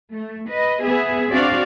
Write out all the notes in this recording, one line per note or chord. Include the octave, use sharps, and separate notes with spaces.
A3
B4 D#5
B3 G#4 E5
C4 D4 F#4 D5 F5